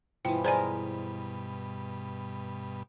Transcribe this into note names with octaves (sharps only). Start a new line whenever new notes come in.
G2 B2 E3 F3 G5
G#3 A#4 C5 D5 G#5